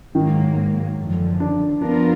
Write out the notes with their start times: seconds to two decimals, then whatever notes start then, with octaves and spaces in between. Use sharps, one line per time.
0.15 G#2 D#3 F#3 A#3
0.97 F#2 D3 F3
1.40 D4
1.81 F3 B3 D4 F4 A#4